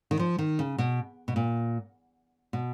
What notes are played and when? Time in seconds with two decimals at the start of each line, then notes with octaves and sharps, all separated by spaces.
0.11 D#3
0.19 F3
0.39 D#3
0.59 C#3
0.78 B2
1.28 B2
1.36 A#2
2.53 B2